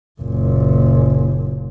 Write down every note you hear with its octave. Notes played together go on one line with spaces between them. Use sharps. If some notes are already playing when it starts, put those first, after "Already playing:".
F#1 A#2